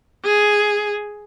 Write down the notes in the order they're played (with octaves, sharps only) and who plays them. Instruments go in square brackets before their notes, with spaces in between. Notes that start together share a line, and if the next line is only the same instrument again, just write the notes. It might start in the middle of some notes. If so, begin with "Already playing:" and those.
[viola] G#4